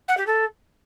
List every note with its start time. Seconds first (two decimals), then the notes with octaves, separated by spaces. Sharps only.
0.08 F#5
0.17 G4
0.27 A4